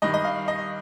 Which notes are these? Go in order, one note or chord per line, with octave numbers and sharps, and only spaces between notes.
G2 D#3 D#5
D#5
F5
D#5